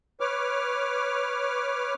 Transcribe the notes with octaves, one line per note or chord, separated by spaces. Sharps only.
B4 C#5 D6 F6